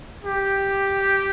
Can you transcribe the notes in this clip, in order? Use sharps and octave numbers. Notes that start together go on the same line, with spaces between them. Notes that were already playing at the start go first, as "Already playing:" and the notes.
G4